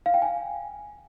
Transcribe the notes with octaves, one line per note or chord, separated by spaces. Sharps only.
F5
G5
G#5